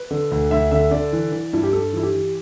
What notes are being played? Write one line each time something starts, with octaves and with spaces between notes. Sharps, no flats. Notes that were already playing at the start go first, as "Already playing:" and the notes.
Already playing: B4
D3
D2
D2 E5
D3 E5
D3 D5
E3
E3
G2 E4
G4
G2 A4
E3 E4
G4
E3